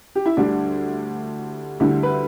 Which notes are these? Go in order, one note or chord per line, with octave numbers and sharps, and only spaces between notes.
G4
E4
D2 D3 G3 D4
D2 D3 G3 E4
B4